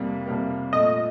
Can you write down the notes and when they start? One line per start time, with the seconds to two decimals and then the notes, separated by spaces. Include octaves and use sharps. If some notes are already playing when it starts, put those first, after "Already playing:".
Already playing: F2 C3 G3 A#3
0.26 F2 C3 G3 A#3
0.73 A#2 F3 A3 D#5